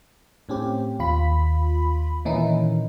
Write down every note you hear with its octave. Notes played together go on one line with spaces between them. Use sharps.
A2 C4 C#4 G4
D#2 F4 B5 B6
A#2 D#3 E3 C#4 D#4 E4